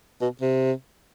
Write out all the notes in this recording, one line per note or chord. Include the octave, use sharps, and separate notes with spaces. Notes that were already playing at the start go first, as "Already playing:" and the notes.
B2
C3